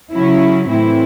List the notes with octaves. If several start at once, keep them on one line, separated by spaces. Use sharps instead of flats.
C#3 F#3 C#4 E4
A2 E3 C4 E4